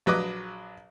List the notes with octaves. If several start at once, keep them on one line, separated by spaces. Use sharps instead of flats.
A#1 F#3 B4 D#5 D6